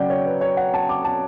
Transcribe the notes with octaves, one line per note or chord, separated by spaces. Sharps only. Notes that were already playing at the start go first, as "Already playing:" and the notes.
Already playing: C#3 F#3 C#4 D5 F#5 G5
C#5
B4
C#5
F#5
A5
D6
A5